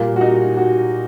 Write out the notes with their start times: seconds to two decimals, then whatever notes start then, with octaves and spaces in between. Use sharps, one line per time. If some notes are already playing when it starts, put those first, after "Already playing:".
Already playing: A#2 G3 A#3
0.16 F#4
0.21 D#4
0.57 F#4